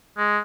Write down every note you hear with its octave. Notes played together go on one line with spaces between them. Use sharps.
G#3